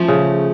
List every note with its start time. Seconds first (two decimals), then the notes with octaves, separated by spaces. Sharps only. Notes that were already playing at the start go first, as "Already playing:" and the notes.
Already playing: F3 A3 C#4
0.08 C#3